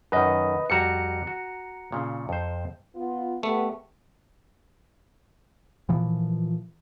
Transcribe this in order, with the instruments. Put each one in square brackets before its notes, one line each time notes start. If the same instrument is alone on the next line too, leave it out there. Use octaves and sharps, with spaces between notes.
[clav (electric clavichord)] F#2 D#3 [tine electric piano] B4 D#5
[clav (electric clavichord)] F2 G3 F#4 [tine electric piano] A#5 C#7
[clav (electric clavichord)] F#4
A#2 C#3
F2 C5
[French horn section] B3 F4
[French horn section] G3 B3 [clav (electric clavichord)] A3
[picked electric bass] A#2 E3 F3